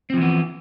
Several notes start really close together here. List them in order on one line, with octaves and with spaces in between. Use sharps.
C4 F3 E3 B3